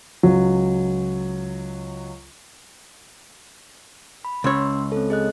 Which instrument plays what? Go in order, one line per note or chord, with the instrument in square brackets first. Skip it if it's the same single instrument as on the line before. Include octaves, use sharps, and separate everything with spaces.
[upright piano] C#2 F#3
[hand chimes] B5
[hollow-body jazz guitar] C#2 C#5 [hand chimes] C#4 C6 E6
[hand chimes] C4 A4
G#4 D#5 F#6